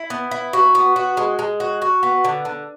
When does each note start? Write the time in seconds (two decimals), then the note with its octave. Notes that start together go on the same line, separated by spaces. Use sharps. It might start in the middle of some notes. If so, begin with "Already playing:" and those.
Already playing: E4
0.10 B3
0.31 E4
0.53 F#4
0.75 B3
0.96 F#4
1.17 G#3
1.39 G#3
1.60 F#4
1.82 F#4
2.03 B3
2.24 D3
2.45 D3